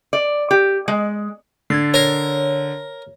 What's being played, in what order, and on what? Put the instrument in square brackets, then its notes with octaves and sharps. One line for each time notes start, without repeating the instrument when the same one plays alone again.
[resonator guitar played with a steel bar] D5
G4
G#3
[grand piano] D3 [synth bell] G#6 A6 C7
[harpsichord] A#4 [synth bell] C#5